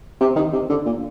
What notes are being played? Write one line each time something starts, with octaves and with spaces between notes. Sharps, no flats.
C3
D#3
C3
D3
A#2